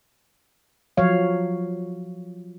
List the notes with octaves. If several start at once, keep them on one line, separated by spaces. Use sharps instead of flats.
F3 F#3 C#5 F5